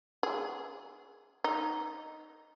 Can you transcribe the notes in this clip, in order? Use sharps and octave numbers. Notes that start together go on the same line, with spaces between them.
G#4
D#4